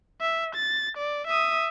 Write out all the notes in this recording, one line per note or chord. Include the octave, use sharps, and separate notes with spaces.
E5
A6
D5
E5 D#6